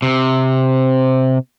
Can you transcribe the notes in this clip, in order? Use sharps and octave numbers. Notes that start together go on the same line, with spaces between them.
C3